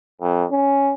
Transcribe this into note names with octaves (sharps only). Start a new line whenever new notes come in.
F2
C#4